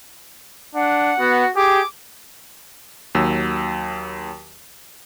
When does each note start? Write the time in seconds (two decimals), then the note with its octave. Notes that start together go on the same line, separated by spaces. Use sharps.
0.75 D4 F#5
1.19 B3 F#4
1.56 G4 G#4 D6
3.15 D#2 F#3 E6